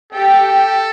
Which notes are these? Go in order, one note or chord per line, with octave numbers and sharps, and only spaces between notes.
G4 A4 G5